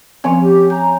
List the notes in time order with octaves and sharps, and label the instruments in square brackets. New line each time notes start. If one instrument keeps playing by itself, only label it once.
[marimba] F3 C4 C#5 [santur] C#4
[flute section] G4
[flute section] A#5 [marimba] G6